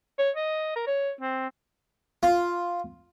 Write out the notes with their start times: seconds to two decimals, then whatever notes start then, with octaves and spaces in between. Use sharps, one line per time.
0.19 C#5
0.36 D#5
0.76 A#4
0.87 C#5
1.21 C4
2.23 F4